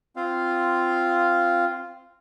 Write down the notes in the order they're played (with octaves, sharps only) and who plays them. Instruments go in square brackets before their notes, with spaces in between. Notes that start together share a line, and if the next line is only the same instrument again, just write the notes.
[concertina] C4 F4 F5